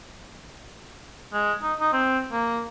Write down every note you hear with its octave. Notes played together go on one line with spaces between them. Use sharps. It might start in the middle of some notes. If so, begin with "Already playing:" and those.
G#3
D#4
D#4
C4
A#3